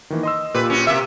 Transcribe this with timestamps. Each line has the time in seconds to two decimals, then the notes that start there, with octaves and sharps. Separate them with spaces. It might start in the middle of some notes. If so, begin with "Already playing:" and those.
0.10 D#3 E3 A#3
0.23 D#5 C6 E6
0.54 A#2 G4 B4
0.70 C#4 F#4
0.87 C3 A#3 G4 E5